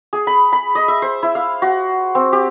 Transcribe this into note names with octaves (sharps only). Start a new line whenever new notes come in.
G#4
B5
B5
D#5
E5
C5
E4
F5
F#4
C4
G4